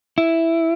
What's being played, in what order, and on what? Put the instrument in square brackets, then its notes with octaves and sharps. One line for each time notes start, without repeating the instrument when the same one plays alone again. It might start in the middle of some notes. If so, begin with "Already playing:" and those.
[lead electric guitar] E4